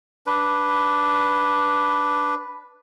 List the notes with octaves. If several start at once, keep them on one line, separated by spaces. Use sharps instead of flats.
D4 B4